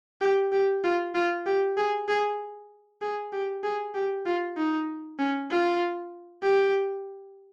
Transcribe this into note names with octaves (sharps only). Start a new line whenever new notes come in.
G4
G4
F4
F4
G4
G#4
G#4
G#4
G4
G#4
G4
F4
D#4
C#4
F4
G4